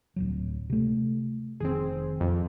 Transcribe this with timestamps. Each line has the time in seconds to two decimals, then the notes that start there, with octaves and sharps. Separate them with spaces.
0.16 D1 A#1 F#3
0.70 C3 A3
1.60 F1 D#3 C4 G#4
2.20 F2